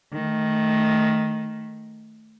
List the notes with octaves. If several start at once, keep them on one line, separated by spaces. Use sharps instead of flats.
D#3 A3